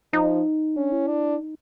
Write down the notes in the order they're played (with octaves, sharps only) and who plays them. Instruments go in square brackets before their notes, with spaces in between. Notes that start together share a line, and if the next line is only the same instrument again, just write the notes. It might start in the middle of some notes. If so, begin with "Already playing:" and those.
[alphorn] F3 [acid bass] D#4
[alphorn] C#4 [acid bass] D4
[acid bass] E4
[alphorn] D4
[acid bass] D#4